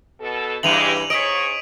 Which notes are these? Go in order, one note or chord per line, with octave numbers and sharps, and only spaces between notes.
B2 A4
G2 C#3 E3 G#3 G4 D#7 F7 F#7
G#2 C#5 D#5 B6 D7